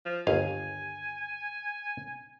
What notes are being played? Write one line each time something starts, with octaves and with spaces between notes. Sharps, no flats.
F3
G1 D#2 F5 G#5